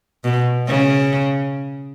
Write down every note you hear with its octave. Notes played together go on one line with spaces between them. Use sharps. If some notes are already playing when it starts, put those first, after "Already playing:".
B2
C#3